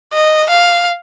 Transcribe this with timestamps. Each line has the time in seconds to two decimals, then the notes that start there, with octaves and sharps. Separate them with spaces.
0.13 D#5
0.50 F5